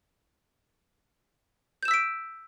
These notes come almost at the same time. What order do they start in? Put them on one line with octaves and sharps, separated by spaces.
G6 E7 E6 B6 D7